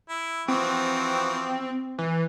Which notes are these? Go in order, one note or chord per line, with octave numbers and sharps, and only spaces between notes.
E4
E3 F3 C4 F#4
E3